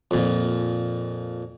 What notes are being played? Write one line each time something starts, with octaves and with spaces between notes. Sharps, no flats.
F2 A#2